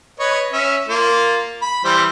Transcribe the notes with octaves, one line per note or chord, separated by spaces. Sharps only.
B4 C#5 D#5
C#4 E5
A#3 F4
B5
E3 G3 C5